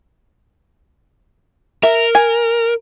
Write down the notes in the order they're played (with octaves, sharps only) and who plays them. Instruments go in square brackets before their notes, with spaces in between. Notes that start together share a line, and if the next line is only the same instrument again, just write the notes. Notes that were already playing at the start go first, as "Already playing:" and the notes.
[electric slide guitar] A#4 [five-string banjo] E5
[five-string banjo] G#5